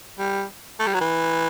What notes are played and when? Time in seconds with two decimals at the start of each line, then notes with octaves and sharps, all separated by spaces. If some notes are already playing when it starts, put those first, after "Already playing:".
0.19 G3
0.79 A3
0.87 G3
0.94 F#3
1.01 E3